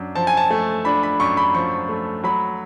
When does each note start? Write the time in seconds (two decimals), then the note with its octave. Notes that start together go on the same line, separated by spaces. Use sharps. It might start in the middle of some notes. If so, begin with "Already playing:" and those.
Already playing: F#2 D4
0.15 F3 A5
0.27 G#5
0.37 A5
0.50 A3
0.85 D4 B5
1.03 B5
1.20 F#2 C#6
1.37 B5
1.55 F3 C#6
1.89 A3
2.24 F#3 B5